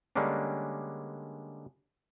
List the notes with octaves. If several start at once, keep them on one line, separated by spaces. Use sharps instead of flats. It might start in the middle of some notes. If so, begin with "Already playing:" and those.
D3 G3 G#3 A#3 C#4 D4